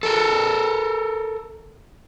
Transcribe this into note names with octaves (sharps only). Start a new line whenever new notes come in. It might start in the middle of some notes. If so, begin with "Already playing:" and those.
A4 A#4